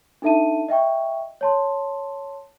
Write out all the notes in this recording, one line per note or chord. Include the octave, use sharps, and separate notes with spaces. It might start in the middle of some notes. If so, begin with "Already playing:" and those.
D4 D#4 A4 E5 A5 D#7
D#5 E5 G5 C#6
C#5 A5 C6